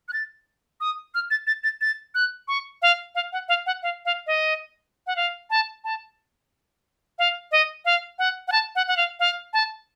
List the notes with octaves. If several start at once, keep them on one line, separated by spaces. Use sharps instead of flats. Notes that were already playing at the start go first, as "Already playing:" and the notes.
F#6
A6
D#6
F6
A6
A6
A6
A6
F#6
C#6
F5
F5
F#5
F5
F#5
F5
F5
D#5
F#5
F5
A5
A5
F5
D#5
F5
F#5
F#5
A5
F#5
F#5
F5
F5
A5